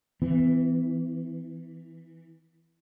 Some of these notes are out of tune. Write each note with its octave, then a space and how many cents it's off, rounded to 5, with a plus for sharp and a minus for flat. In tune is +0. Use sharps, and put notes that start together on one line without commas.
E3 +0 B3 +45